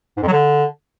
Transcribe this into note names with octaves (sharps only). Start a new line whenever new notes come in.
G#2
F2
F#3
D3